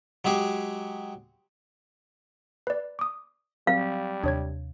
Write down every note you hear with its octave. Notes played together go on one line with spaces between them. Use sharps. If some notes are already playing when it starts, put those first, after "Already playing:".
F#3 G#3 G4 G#4
B4 D5
D6 D#6
F#3 G3 C4 F5
D#2 C3 D4 C#5 G#6